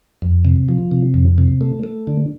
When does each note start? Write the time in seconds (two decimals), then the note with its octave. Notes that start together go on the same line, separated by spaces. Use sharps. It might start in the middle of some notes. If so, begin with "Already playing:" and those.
0.22 F2
0.45 C3
0.69 F3
0.91 C3
1.14 F2
1.38 C3
1.61 A3
1.83 A3
2.07 D3